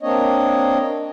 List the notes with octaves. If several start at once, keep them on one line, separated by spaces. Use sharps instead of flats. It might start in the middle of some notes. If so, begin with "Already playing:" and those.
A#3 C4 D4 C#5 D#5